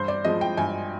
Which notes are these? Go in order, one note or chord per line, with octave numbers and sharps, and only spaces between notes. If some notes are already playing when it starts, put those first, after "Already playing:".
Already playing: G2 C5
D5
F3 G#3 D#5
G5
G2 G#5